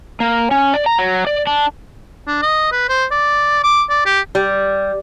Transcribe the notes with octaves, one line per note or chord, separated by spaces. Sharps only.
A#3
C#4
D5
A#5
F#3
D5
D4
D4
D#5
B4
C5
D5
D6
D5
G4
G3